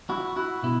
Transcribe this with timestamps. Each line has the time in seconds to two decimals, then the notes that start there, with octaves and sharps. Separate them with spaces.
0.10 E4 F#4
0.36 E4 F#4
0.63 B2 E4